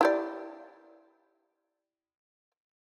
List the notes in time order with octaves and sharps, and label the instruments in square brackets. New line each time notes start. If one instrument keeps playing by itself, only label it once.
[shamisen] E4 G4 D5